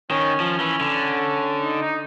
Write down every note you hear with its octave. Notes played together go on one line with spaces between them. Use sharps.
D#3 C#4
F3
E3
D3
D#4
D#4